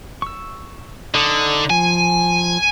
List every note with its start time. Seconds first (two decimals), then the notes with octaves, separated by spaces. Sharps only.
0.22 C#6 E6
1.14 D3 D#4 D#6
1.70 F3 G#5